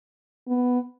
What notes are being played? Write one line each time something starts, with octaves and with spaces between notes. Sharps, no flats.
B3